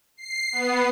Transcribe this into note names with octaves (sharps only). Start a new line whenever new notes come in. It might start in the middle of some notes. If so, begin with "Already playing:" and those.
C7
B3